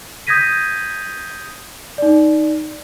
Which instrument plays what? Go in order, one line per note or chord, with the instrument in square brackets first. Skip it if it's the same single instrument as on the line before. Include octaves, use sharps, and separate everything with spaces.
[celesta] D#6 G6 G#6 A#6 B6 D#7
D#4 D5